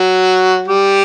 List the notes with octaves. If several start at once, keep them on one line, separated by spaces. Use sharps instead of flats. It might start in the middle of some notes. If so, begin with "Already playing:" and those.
Already playing: F#3 F#4
G3 G4